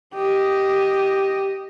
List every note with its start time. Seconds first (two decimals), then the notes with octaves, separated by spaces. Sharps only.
0.14 G4 D#5